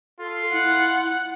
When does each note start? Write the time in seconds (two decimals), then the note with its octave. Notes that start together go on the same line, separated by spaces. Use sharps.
0.20 F4 A4
0.53 E4 F#5